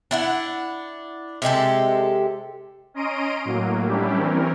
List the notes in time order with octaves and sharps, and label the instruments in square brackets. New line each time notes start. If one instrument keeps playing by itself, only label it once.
[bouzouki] D4 E4 F#5
C3 G#3 G4 A4
[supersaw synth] C#4 D#5 A#5 C6 D7 D#7
A2 F#3 A#3
G3 C#4 D4 E4 G4
E3 C4 C#4 A#4